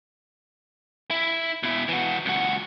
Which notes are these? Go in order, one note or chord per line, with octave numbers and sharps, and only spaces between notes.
E4
B2 E4
E3 F#4
C#2 F#4